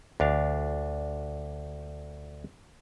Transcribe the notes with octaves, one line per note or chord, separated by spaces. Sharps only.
D2 D4 F5